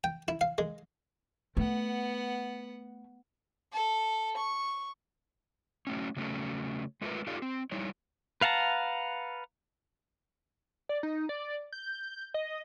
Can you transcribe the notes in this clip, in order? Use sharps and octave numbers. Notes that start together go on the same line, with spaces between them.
G5
E4
F5
G#3
A3 B3 F#5
A4
C#6
F#3 A3 C#4
C#3 F#3 A3 C#4 A4
G#3 A3 F4 G#4 A#4 B4
D#4 F4 G4 A4 D5 F5
C4
G3 D#4 E4 C#5
B4 F5 F#5 A5 A#5
D5
D#4
D5
G6
D#5